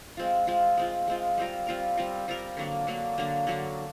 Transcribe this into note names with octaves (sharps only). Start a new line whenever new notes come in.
G#3 C4 F4
G#3 C4 F4
G#3 C4 F4
G#3 C4 F4
G3 C4 F4 A#4
G3 C4 F4 A#4
G3 C4 F4 A#4
G3 C4 F4 A#4
D3 F#3 A#3 D4
D3 F#3 A#3 D4
D3 F#3 A#3 D4
D3 F#3 A#3 D4